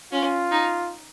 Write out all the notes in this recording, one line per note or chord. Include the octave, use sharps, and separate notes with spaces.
C#4 F4
D#4